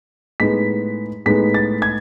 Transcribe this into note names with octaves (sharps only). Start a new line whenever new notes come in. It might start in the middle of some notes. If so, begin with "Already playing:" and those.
A2 G#3 B3 D#4 B6
A2 G#3 B3 D#4 B6
A6
G#6